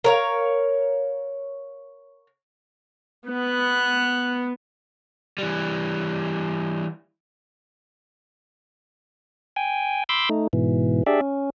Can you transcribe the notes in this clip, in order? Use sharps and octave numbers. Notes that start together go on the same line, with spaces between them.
A#4 C#5 F5
B3 F#6
E3 G3
G5 G#5
B5 C6 D6 E6 G6
A3 D#4
G#2 B2 E3
D4 G4 G#4 D5 E5
C#4